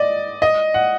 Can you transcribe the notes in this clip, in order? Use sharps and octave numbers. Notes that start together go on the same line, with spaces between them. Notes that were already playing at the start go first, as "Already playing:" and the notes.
Already playing: D5 D#5
D#5
F#5